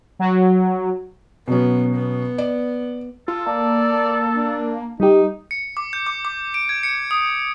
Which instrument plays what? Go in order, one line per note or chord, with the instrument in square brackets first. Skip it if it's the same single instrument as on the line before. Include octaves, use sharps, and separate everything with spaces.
[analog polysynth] F#3
[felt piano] B2 F#3 C#4 [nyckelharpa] B3
[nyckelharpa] B3
[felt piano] D5
[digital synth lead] F4 [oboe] A4
[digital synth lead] A#3 [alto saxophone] D5 [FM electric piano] A5
[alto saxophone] D4
[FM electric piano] G3 G4 [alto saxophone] D#4
[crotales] C#7
D6
G6
D6
D6
D7
G#6
C#7
D#6